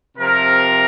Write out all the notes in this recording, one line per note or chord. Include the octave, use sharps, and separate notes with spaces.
C3 F3 A#4